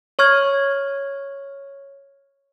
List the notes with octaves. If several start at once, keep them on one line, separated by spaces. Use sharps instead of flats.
C#5 C#6 F6 G#6